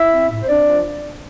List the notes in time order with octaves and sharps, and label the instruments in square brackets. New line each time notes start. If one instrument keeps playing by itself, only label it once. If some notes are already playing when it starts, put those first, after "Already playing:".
Already playing: [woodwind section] E4 E5
C4
A2
C5
C4 D4 D5
F3